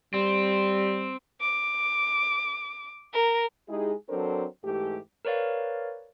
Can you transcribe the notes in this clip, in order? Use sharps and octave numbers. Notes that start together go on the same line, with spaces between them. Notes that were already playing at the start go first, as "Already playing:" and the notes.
G3 C4
D6
A#4
G#3 D#4 E4 G4 G#4
F#3 C4 D4 A4 A#4 C5
G#2 E3 A3 G4
A#4 B4 C#5 D5 F5